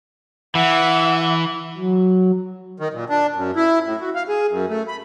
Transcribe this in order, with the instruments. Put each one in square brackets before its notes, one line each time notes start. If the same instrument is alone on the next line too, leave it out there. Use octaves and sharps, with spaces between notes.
[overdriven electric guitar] E3 [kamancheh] E5 F#5
[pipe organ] F#3
[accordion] D#3
A#2
D4
F#2
E4
A2
F#4
F5
G#4
F#2
A3
B5